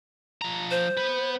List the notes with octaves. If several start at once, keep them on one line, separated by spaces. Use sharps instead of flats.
F3 A#5
C5
B3 B4